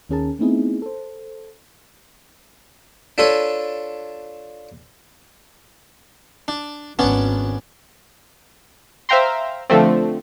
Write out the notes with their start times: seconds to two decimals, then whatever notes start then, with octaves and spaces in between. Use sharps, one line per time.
0.09 D#2 D#3 C#4 G#4 A#4 A5
0.39 A3 B3 C4 D#4 E4 G#4
0.82 A4 C5
3.18 D4 F4 A4 B4 C#5 G#5
6.48 D4
6.99 G#1 B3 C#4 D4
9.09 C5 E5 F5 G5 A#5 C6
9.70 D3 F3 A3 C4